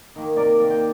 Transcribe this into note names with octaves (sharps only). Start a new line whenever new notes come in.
D#3 A#3
C3 A#4 D5
D#3 A#3
G5